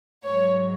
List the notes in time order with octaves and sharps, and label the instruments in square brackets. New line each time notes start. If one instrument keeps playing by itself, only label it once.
[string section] G#2 F#3 C#5